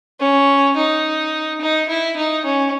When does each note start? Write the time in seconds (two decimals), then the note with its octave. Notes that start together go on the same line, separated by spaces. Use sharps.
0.20 C#4
0.76 D#4
1.61 D#4
1.89 E4
2.16 D#4
2.45 C#4